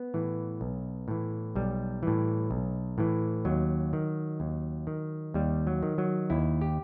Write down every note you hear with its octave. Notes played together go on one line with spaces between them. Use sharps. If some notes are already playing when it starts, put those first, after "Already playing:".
Already playing: B3
A2 E3
B1
A2 E3
B1 G3
A2 E3
B1
A2 E3
D#2 F#3
D#3
D#2
D#3
D#2 G3
F#3
D#3
F#3
D#2 E4
G4